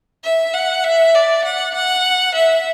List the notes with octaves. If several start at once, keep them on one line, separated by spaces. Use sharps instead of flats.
E5
F#5
E5
D5
F#5
F#5
E5